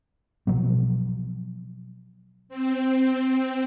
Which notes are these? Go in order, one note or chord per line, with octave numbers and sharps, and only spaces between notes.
B2 F3 F#3 B3
C4